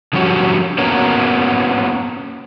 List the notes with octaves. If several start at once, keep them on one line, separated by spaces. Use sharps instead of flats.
D3 F3 G3 C#4 F#4
A#3 B3 C#4 F#4 A#4